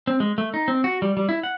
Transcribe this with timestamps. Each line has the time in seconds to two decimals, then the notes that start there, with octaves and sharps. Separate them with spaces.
0.07 C4
0.20 G#3
0.38 A3
0.54 D#4
0.68 C4
0.84 F#4
1.02 G3
1.17 G3
1.29 E4
1.43 F#5